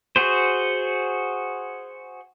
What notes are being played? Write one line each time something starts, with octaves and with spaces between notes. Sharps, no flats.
F#4 G#4 C5